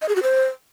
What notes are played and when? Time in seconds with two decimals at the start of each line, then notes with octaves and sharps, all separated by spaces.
0.02 D#5
0.09 G#4
0.16 F#4
0.23 C5